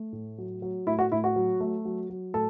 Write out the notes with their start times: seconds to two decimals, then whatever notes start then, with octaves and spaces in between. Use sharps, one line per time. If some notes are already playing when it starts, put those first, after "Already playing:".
Already playing: A3
0.13 A2
0.38 F#3
0.62 F#3
0.87 A2 E4
0.99 F#4
1.12 A2 E4
1.24 F#4
1.36 F#3
1.60 A3
1.85 F#3
2.10 F#3
2.34 A2 A4